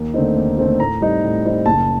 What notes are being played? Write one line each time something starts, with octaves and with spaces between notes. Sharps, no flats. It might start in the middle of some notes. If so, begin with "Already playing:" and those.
Already playing: D#2
D3 A3 C4 D#4
D#2
D3 A3 C4 D#4
A2 A#5
G3 C4 D#4
A2
G3 C4 D#4
F#1 A5